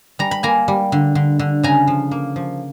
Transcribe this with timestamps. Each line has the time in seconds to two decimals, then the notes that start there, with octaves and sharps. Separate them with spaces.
0.19 G3 A#5
0.31 B5
0.43 A#3 G#5 A#5
0.68 G3
0.92 D3
1.15 D3
1.39 D3
1.63 C#3 G#5 A#5
1.87 F3
2.11 A#3
2.36 F3